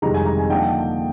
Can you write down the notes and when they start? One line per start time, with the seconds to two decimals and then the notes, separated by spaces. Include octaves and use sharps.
0.02 G1 F2 C3 D#3 G#3 A#5
0.14 G#5
0.26 A#5
0.38 G#5
0.50 D3 F3 A#3 D#4 G5